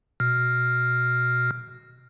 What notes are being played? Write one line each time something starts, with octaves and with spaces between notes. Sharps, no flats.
B2 F6